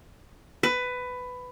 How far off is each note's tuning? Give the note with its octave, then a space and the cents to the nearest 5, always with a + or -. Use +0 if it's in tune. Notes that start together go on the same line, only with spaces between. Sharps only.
B4 +15